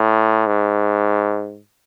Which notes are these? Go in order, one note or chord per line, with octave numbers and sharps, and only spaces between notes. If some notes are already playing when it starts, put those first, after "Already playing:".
Already playing: A2
G#2